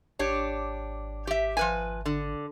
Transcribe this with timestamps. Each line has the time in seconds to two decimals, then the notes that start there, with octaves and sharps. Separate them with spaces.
0.19 G#1 D4 G4 C#5
1.27 G4 E5
1.57 F3 B4 G#5
2.06 D3